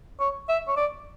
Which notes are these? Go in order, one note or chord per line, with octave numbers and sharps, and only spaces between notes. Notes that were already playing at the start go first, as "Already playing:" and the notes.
C#5
E5
C#5
D5